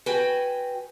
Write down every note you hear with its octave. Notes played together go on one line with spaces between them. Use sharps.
F#4 B4 G5 G#5